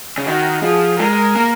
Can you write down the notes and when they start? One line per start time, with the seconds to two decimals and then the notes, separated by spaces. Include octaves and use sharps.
0.18 C#3
0.26 D#3 F#4
0.63 F3 G#4
0.99 G#3 A#4
1.36 A#3